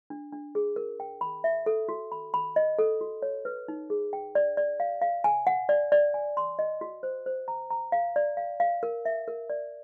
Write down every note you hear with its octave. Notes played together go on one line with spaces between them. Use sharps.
D4
D4
G#4
A#4
G5
B5
E5
A4
F#4
B5
B5
D#5
A4
F#4
C#5
B4
D#4
G#4
G5
D5
D5
F5
F5
G#5
F#5
D5
D5
G#5
C6
D#5
F#4
C5
C5
A#5
A#5
F5
D5
F5
F5
A#4
E5
A#4
D5